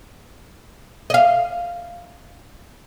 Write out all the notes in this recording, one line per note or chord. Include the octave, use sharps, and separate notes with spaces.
D#5 F5